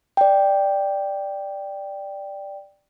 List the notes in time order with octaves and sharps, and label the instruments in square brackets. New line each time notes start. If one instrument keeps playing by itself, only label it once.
[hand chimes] D5 G5